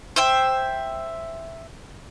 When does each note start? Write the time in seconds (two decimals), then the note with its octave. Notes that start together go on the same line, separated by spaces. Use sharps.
0.16 C5 E5 G5